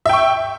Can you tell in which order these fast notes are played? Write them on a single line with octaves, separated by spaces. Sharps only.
E5 G5 C#6